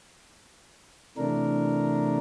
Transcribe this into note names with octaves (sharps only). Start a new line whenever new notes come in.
C3 E3 A3 D4 A#4